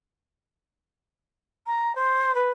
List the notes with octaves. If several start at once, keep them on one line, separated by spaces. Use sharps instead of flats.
A#5
C5
B4